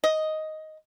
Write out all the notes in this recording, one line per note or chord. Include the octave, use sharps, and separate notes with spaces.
D#5